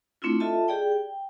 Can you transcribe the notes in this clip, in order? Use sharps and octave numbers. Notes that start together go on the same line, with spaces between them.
A3 C4 D4 E4 F4
F4 A4 D#5 E5 A5
G4 G#4 D5 G5
G5